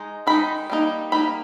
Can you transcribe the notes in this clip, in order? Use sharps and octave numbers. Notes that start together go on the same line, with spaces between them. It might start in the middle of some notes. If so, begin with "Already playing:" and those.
Already playing: G#3 D#4
D#3 G#3 D#4 B5
G3 A#3 D#4
G3 A#3 D#4 B5